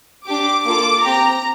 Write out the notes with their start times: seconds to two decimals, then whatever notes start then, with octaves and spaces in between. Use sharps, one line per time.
0.28 D4 G4 D6
0.66 A#3 F4 A4 D6
1.04 C4 G4 A#5